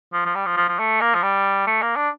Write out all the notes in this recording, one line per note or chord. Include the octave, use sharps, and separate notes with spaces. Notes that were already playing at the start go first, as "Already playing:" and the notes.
F3
F3
G3
F3
F3
F3
A3
A#3
F3
G3
A3
A#3
D4